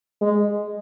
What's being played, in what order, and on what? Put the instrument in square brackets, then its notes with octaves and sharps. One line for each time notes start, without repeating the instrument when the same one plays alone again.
[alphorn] G#3